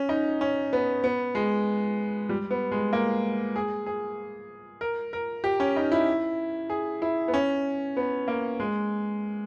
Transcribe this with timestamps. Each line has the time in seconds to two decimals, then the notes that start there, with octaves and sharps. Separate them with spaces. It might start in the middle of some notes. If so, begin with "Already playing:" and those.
Already playing: C#4
0.09 D#4
0.41 C#4
0.73 B3
1.04 B3
1.35 G#3
2.29 G3
2.51 B3
2.72 G#3
2.93 A#3
3.56 G#4
3.86 G#4
4.81 A#4
5.13 A#4
5.44 G4
5.60 C#4
5.76 D#4
5.92 E4
6.70 G#4
7.02 E4
7.28 B3
7.34 C#4
7.97 B3
8.28 A#3
8.60 G#3